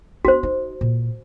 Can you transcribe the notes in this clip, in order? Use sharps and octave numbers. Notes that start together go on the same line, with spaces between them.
B3 D4 F#4 C5
D#4
A#2